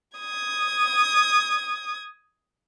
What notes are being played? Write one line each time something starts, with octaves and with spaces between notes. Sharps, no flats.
D#6 G#6